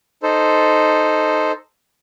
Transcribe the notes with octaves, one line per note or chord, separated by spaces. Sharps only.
D#4 A4 C5